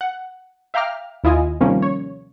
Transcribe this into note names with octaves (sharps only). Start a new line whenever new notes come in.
F#5
E5 F5 G5 A#5 D6 F6
D#2 E4 F4 D#5 G#5
C3 D#3 F3 G3 A#3 C#4
C#5